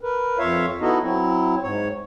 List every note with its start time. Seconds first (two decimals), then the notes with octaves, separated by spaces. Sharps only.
0.01 A#4 B4
0.39 F2 F4 C#5 E5 F5
0.81 B3 D#4 E4 F#4 A4 D#5
1.03 F#3 C4 E4
1.63 G#2 C#5